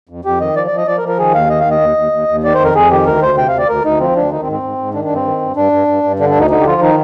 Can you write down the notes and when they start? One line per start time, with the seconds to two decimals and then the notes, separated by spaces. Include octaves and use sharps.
0.09 F2
0.25 F2 G4
0.40 D#3 D#5
0.56 F3 D5
0.67 D5
0.71 F3
0.77 D#5
0.87 F3 D5
0.98 A#4
1.03 F3
1.08 A#4
1.18 D#3 G#4
1.34 D#2 F5
1.50 D#3 D#5
1.60 F5
1.66 D#2
1.71 D#5
1.81 D#2
1.97 D#2
2.12 D#2
2.28 D#2
2.44 D#3 D5
2.54 C5
2.59 F2
2.64 A#4
2.75 F2 G#4
2.91 D#3 G4
3.06 D2 A#4
3.22 D2 C5
3.38 C3 G5
3.48 F5
3.53 D2 D5
3.69 D2 A#4
3.85 D2 D#4
4.00 F3 C4
4.16 D2 D4
4.31 D#3 D#4
4.42 C4
4.47 G#2
4.52 C4
4.63 G#2
4.78 G#2
4.94 D#3 D4
5.05 D4
5.09 G2
5.15 C4
5.25 D#3
5.41 G2
5.56 G2 D4
5.72 G2
5.88 G2
6.03 G2
6.19 D3 D4
6.29 D4
6.35 D2 D#4
6.50 D3 D#4
6.61 G4
6.66 F3 F4
6.82 D#3 D#4